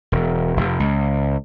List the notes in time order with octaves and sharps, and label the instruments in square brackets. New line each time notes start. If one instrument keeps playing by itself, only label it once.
[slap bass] E1
F1
C#2